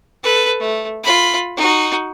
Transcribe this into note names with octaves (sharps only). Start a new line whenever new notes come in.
A4 B4
A3
F4 B5
D#4 F#4